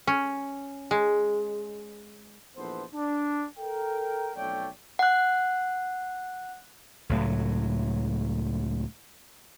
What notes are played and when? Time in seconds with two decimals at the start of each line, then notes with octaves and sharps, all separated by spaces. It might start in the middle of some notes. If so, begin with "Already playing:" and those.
0.07 C#4
0.91 G#3
2.57 A#1 E3 B3 A4 C5
2.94 D4
3.57 A4 A#4 G5
4.35 B1 F2 A3 C#5 D5 G5
4.99 F#5 F#6
7.09 C#2 A2 F#3